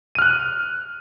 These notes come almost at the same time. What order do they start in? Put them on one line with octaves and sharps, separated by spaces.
D#7 F6 F#6